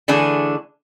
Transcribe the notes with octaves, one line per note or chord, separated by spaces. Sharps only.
D3 E3 A3 D4 G#4